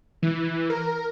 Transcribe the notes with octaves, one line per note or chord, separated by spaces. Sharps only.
E3
A#4